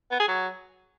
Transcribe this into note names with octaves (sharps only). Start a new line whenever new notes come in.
B3
G#4
F#3